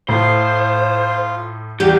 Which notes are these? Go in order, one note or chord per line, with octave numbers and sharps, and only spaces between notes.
A2 F4 C5
E2 F#3 G3 G4